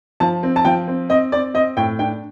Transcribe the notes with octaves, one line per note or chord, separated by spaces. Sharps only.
F3 A5
C4
A5
F3 G5
C4
C4 D#5
C4 D5
C4 D#5
A2 G5
D4 G5